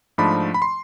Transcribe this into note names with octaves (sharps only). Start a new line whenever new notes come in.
G#2 F3 A3 D4 B5
B5
C6